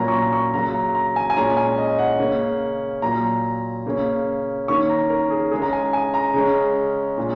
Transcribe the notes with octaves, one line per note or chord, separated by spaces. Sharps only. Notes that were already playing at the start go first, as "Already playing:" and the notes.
Already playing: A#2 F#3 A#3 C#4 A#5
C#6
A#5
C#6
C#3 F#3 A#3 A#5
A#5
A#5
G#5
G#5
A#2 G#3 C#4 A#5
G#5
D#5
F#5
C#3 A#3 C#4
A#2 F#3 A#3 A#5
C#3 A#3 C#4
D#3 A#3 C#4 C#6
A#5
A#4
G#4
C#3 G#3 C#4 G#4
A#5
G#5
G#5
A#5
C#3 G#3 C#4
A#2 G#3 C#4